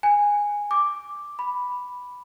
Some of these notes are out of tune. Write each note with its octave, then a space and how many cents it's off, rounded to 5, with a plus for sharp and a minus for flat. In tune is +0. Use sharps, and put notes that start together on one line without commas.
G#5 -10
D6 +0
B5 +0